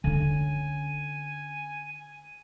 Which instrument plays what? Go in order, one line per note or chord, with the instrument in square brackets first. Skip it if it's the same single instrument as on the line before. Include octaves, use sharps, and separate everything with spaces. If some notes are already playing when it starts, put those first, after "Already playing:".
[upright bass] D3 C#4 [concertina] G#5